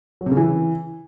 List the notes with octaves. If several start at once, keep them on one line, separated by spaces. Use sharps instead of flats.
F#3
C3
C#3
E3